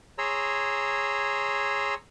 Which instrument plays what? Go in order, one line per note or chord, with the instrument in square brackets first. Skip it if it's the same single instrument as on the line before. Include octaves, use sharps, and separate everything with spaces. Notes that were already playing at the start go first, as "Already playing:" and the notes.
[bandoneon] G#4 C#5 A#5 C6 E6